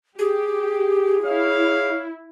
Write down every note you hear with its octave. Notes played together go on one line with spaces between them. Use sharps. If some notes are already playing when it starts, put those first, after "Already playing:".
G4 G#4
E4 C#5 F5